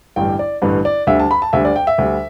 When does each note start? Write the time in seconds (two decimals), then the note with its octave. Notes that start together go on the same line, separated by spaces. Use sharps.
0.16 A1 G2 D3 G3 G5
0.39 D5
0.62 A1 G2 D3 G3 B4
0.85 D5
1.07 D2 D3 G3 E5
1.20 A5
1.31 B5
1.42 A5
1.53 D2 D3 G3 E5
1.65 D5
1.76 G5
1.87 E5
1.98 D2 D3 G3